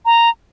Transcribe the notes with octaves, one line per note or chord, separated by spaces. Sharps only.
A#5